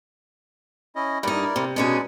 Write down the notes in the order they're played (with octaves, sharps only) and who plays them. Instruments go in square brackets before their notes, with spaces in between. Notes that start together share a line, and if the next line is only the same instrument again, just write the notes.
[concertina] C#4 E4 D#5
[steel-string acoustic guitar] G2 D#4 [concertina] E4 A#4 D5
[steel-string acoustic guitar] C3
[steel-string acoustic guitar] B2 C#4 G#4 [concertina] G#3 D#4 D5